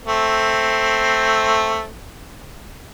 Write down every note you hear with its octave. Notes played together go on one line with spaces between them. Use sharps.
A3 C4